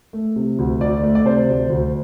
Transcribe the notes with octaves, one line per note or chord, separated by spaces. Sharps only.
A3
C3
D2
D2 D5
A3
D5
C3 C5
D2
D2